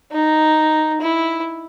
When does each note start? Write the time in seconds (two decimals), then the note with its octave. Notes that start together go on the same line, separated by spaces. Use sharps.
0.12 D#4
1.01 E4